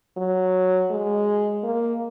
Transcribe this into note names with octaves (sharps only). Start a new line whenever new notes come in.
F#3
G#3
A#3